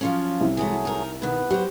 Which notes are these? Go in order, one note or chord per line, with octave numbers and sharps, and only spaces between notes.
F3 F#3 C#4 F4
C2
E3 F#3 G#3 A3 B3 G#4
D#4 A#4
B2 D#3 B3 B4
F#3 G4 C5